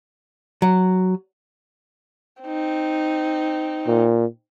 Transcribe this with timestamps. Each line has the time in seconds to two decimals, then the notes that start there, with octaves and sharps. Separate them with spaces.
0.62 F#3
2.43 C4 D#4
3.87 A#2